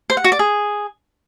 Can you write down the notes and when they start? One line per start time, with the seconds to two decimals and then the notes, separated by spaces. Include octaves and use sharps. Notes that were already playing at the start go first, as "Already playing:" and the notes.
0.10 C5
0.17 F#5
0.24 F#4
0.32 D5
0.39 G#4